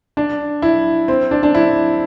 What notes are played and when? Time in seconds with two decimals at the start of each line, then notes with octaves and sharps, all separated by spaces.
0.17 D4
0.62 E4
1.08 C4
1.31 D4
1.43 D4
1.55 E4